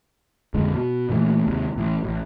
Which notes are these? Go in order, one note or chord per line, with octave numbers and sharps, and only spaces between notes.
G#1 F2 D3 G#3
B2
A#2 E3 F3 A3
D#2 C3
A1 A2 E3
A1